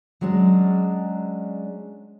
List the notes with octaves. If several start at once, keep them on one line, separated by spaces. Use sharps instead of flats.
F#3 G#3 C#4 D4